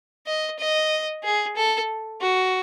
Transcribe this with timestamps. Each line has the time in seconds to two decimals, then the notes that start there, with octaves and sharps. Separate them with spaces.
0.26 D#5
0.59 D#5
1.23 G#4
1.56 A4
2.21 F#4